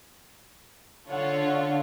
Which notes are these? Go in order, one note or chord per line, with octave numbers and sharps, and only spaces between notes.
D3 F4 A4 C#5 F#5